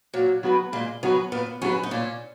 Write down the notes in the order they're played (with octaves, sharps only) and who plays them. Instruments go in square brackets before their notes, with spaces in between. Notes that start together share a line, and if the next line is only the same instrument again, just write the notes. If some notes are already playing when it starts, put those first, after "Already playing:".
[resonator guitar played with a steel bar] A#2 [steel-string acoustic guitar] F#3
[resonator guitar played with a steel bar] F#3 B3 F#4 B4
[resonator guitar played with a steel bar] A#2 [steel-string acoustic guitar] G#3
[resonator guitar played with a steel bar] F#3 B3 F#4 B4 [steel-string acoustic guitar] C#4
[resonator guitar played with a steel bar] A#2 [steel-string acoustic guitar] B3
[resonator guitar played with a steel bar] F#3 B3 F#4 B4 [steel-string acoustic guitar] C#4
[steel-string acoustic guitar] D#4
[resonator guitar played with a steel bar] A#2 [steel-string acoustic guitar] C#4